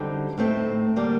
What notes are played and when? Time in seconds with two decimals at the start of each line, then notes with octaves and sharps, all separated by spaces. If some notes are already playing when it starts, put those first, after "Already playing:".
Already playing: F#2 D3 G3 C4 D#4
0.38 A2 A3 C4 D#4
0.96 D3 G3 A#3